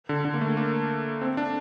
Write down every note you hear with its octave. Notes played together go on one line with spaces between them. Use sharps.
D3
D3
A#3
A3
A#3
C4
D4